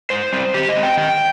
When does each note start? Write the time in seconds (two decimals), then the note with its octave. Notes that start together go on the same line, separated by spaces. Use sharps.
0.10 G#2 C5
0.32 G3 C4
0.54 D#3 G4
0.69 D#5
0.76 G#3 C4
0.83 G5
0.97 D#3 G5